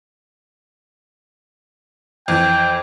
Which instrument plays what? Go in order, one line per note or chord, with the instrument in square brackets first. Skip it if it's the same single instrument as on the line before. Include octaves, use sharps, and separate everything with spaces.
[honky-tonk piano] F2 E3 [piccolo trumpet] G5